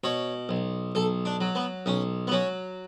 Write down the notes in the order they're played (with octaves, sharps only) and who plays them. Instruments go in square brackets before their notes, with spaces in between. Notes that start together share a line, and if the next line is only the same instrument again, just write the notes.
[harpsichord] B2 C#5
B1
B1 A4
D4
F#3
B3
B1 C#4
B3
F#3 C#4